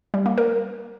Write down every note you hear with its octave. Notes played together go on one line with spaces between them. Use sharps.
G3
A#3
A#4